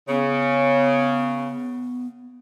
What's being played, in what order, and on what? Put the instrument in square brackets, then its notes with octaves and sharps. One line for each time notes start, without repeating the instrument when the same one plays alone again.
[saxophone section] C#3 [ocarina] B3